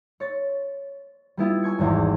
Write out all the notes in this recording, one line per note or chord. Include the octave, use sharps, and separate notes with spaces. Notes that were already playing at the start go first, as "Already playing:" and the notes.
C#5 A6
G3 B3 E4 F4
G#5 C#6 G#6 C#7
D#1 G#1 E2